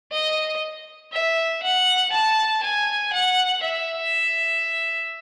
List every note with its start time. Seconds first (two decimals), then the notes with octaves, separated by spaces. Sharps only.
0.12 D#5
1.12 E5
1.62 F#5
2.12 A5
2.62 G#5
3.13 F#5
3.63 E5